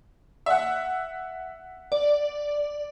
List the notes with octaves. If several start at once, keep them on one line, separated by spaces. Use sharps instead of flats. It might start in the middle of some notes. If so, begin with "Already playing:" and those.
E5 F#5
D5